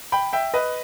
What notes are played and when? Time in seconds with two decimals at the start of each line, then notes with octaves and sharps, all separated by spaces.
0.12 G5 B5
0.33 E5 G5
0.54 B4 D#5